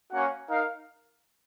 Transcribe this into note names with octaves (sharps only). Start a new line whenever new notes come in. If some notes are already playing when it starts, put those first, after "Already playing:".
A#3 C#4 F#4 C#5 F#5
D#4 A#4 F5